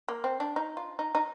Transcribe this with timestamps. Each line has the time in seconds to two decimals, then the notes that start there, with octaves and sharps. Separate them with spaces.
0.08 A#3
0.24 C4
0.40 D4
0.56 D#4
0.77 F4
0.99 D#4
1.15 D#4